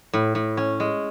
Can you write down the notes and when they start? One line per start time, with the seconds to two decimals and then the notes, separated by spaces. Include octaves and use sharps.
0.13 A2
0.35 A2
0.57 C#4
0.80 G#3